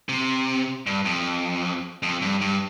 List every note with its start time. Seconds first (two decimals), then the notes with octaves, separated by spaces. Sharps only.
0.09 C3
0.86 G2
1.05 F2
2.03 F2
2.22 G2
2.41 G2